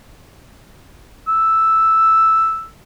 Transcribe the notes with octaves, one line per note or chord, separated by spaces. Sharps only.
E6